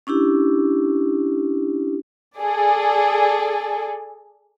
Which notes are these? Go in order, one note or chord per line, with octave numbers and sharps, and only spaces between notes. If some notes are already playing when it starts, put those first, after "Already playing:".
C#4 D4 E4 G4
G#4 A4 D5